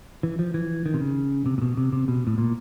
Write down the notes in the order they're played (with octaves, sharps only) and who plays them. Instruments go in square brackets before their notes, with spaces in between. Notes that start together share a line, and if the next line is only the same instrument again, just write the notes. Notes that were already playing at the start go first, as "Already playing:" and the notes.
[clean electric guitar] E3
F3
E3
D#3
C3
C#3
C3
A#2
B2
C3
C3
B2
A2
A#2